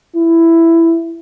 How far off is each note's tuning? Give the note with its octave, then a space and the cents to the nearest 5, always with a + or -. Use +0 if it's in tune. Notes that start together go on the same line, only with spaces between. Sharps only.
E4 +10